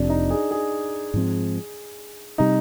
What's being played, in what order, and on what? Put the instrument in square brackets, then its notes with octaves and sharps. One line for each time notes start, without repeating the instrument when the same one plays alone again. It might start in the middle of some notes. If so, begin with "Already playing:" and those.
Already playing: [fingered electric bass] F1 F2 C3 [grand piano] D4
[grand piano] D#4
G#4
G#4
[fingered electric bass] G#2 F3 C4
[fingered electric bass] C3 G3 [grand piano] D#4